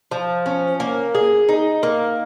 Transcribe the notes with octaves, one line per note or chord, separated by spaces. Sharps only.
F3
C#4
A#3
G#4
D#4
A#3